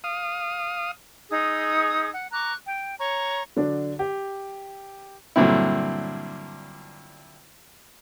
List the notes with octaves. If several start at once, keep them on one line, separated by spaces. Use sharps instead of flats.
F5 D#6
D#4 G#4 D#6 E6
F#5
A#5 C#6 D6 F#6
G5
C#5 A#5 C#6
D3 F#3 D4
G4
G2 A#2 D3 F#3 C4 E4